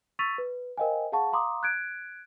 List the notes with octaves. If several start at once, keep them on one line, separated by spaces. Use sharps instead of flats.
C#6 E6 A6 B6 D#7 F7
B4
A#4 C5 D#5 F5 G5 G#5
G#4 F5 F#5 A5 C#6
F5 A#5 C6 D6 D#6
F#6 G#6 D7